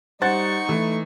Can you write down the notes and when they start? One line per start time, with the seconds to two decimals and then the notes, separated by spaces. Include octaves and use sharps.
0.22 G3 D#4 C5 F#5 C#6 A6
0.69 E3 A3